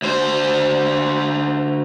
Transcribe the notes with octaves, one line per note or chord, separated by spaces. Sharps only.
D2 C5